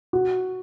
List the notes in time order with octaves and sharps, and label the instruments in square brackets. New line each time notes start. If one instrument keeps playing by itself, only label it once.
[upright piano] F#4